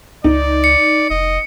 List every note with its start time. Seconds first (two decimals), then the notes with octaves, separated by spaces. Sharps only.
0.24 C#2 D#4 D5
0.64 C#7
1.10 F1 D#5